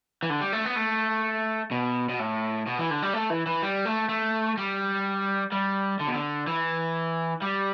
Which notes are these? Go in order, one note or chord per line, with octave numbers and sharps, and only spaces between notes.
E3
D3
G3
A3
B3
A3
B2
B2
A2
B2
E3
D3
G3
A3
E3
E3
G3
A3
A3
G3
G3
D3
B2
D3
E3
G3